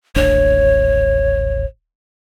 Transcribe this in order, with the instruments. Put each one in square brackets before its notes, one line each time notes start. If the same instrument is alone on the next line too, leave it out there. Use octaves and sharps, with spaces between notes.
[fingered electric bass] D#1 A1 D4 [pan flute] C#5